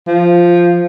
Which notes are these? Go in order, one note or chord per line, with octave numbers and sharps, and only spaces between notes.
F3